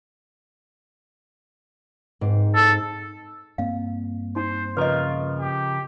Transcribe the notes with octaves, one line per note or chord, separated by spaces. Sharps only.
G#2 C4
A4
G2 A#3 C4 F5
D#4 C5 A5
C#3 F3 F4 A#4 B4 D#5
G4